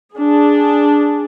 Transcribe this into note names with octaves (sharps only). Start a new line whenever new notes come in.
D4 G#4